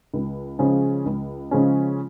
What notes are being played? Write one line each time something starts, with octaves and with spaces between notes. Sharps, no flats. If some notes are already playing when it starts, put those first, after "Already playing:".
C#2
C#3 F3 G#3 C#4
C#2
C#3 F3 G#3 C#4